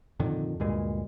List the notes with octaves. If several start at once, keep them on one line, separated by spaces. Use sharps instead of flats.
F2 A#2 D3 D#3
D2 G2 A#2 G#3